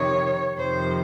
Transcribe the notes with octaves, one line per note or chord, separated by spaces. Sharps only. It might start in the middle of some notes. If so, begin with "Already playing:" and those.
Already playing: F2 C3 D#3 C#5
F2 C3 D#3 C5